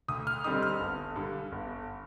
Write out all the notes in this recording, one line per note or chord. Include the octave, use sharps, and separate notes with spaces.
D2 D#6
F6
D3 G3 C4 D#4 D#6
F6
G1
G2 D3
G1